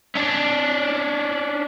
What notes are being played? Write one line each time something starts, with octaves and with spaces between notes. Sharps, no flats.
C#4 D4